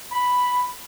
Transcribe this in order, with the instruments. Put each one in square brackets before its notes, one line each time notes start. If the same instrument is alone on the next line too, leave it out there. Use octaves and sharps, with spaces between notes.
[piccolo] B5